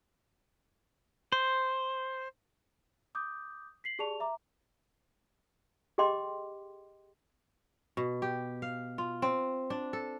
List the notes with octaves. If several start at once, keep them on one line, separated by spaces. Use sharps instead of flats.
C5
D6 D#6 G6
B6 C7 F#7
G4 G#4 D5 A5 C#6 F7
E5 A#5 D6
G4 G#4 D#5 G5 C6 D6
B2
G4
F5
F4
C4
D4
A4